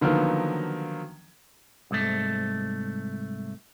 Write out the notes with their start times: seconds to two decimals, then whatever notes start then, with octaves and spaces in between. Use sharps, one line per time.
0.01 D3 D#3 F3 F#3 A#3 B3
1.91 C2 G#2 A3